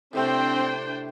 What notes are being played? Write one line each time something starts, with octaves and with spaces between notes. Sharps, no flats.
A2 C3 A3 C4 D4 C5 G5